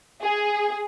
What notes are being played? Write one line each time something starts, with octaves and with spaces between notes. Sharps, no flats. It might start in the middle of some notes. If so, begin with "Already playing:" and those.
G#4